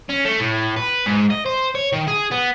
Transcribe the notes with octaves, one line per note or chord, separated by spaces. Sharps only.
C#4
A3
A2
B4
G#2
D#5
C5
C#5
D#3
G#4
B3